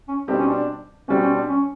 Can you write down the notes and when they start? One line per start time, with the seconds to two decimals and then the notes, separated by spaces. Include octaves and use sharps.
0.08 C#4
0.28 B2 G3 C4 D4 D#4 G4
0.39 C#4
0.48 D4
1.08 B2 G3 C4 C#4
1.22 C#4
1.35 D4
1.48 C#4